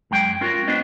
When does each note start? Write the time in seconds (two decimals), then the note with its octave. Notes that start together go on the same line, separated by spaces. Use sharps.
0.11 F#2 G#3 G5
0.41 C#4 F4 F#4 A#4
0.68 B3 D4 F4 C5 D#5